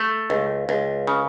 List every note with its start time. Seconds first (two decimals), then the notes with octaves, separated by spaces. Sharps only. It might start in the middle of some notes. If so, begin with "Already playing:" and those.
Already playing: A3
0.30 C#2
0.69 C#2
1.07 C#3